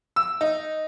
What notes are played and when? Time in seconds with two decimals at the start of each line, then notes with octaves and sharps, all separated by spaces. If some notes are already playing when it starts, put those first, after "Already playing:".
0.16 E6
0.41 D#4